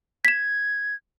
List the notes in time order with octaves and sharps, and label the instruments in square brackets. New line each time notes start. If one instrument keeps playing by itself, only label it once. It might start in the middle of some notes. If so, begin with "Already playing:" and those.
[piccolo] G#6 [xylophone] B6 E7